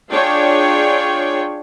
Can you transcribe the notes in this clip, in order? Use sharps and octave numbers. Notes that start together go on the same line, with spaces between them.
D4 F4 G#4 C#5 G5